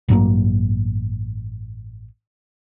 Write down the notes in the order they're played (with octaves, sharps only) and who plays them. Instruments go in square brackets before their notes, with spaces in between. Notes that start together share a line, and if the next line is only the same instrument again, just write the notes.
[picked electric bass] A1 G2 F#3 A#3